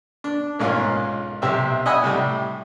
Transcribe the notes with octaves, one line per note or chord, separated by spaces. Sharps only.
D4
B1 G#2 A#3 C#4 F4
B1 C3 G4 C5 E5
D#5 E5 F#5 G#5 B5 D#6
A2 C3 G3